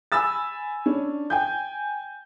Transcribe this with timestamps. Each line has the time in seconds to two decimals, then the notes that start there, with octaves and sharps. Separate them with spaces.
0.12 G#5 B5 E6 A6
0.86 C#4 D4
1.30 G5 G#5 G6